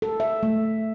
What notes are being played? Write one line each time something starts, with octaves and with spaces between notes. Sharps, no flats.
A4
E5
A3